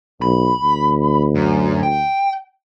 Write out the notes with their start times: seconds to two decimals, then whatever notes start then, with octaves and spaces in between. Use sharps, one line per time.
0.22 B1 B5
0.62 D2
1.35 F#2
1.83 G5